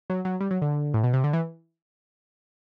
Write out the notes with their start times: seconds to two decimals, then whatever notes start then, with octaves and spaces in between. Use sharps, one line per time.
0.10 F#3
0.25 F#3
0.41 G3
0.51 F#3
0.62 D3
0.94 A2
1.04 B2
1.13 C3
1.24 D3
1.33 E3